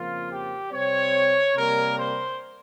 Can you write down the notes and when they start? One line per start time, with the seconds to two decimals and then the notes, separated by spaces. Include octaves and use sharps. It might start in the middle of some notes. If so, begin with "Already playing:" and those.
Already playing: F2 C#3 F3 A#3 F4
0.31 G4
0.72 C3 G3 C4 C#5
1.55 C3 G3 A#3 A#4
1.97 C5